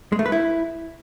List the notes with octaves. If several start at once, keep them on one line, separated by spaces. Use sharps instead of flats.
G#3
A3
B4
E4